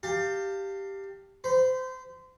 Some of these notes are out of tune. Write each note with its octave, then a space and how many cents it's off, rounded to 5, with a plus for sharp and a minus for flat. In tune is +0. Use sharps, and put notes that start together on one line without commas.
G4 +0 F5 +0 A5 +35
C5 -25 B5 -5